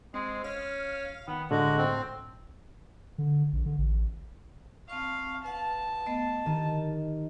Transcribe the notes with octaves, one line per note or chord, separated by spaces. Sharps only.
G#3 C4
C#4 F5
D#3 B3
A2 D3 G#3 F#4
C4
D3
A#1
D3
A1
C4 F5 A5 C#6
B4 F5 F#5 A5
A3 B3 D#5
D#3 G4 D#5